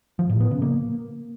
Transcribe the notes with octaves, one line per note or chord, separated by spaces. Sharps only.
F3
A2
B3
C#3
A#3